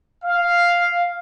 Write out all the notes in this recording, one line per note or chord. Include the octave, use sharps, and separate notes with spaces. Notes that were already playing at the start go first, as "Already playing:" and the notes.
F5